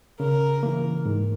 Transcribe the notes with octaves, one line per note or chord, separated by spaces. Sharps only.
C#3 A#4
E3 A#3
G#2